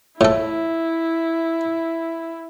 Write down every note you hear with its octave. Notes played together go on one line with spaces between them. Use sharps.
A2 E4 A4